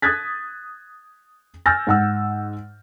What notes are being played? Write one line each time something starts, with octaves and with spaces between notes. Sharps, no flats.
D#6 F#6 G#6 A6 B6
G#5 E6 F6 G6 A6 A#6
G#2 F#5 E6